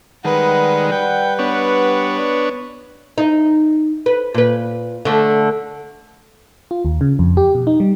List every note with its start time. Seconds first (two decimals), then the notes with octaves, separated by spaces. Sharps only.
0.25 D#3 G3 G#3 B4 F#5
0.92 B4 G5
1.39 B3 D4 C#5
3.18 D#4
4.06 B4
4.34 A#2 B4
5.05 D3 A3
6.71 F4
6.85 D#2
7.01 C#3
7.19 F2
7.37 G4
7.55 B2
7.67 D#4
7.80 G3